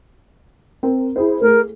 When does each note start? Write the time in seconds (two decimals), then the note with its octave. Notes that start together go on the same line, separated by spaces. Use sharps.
0.83 C4 A#4
1.16 E4 G#4 C5
1.42 A3 G#4 A#4